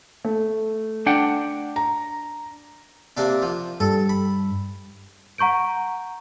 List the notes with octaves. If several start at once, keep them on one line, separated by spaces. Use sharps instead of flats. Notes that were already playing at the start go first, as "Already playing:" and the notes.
A3
D4 F#5 G5
A#5
C3 A#3 D4
F3
G2 A4
B5
F#5 A#5 C#6 G6 D7